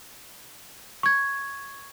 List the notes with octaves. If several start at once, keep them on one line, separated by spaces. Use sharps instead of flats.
C#6 G#6